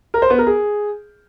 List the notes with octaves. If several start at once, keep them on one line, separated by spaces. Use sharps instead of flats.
A#4
C5
B3
A#4
G#4